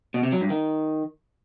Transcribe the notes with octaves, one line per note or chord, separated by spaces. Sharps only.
B2
C3
F#3
G2
D#3